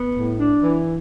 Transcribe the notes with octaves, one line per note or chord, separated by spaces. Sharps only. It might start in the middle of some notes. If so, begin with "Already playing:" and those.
Already playing: B3
A2
D4
E3